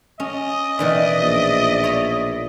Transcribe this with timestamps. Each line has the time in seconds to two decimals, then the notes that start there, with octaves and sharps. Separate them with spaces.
0.20 C#4 D#5
0.79 B2 D#3 E3 D5 E5
1.20 A#1
1.84 C#5 B5